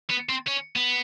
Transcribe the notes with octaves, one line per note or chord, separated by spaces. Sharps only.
B3
C4
C#4
B3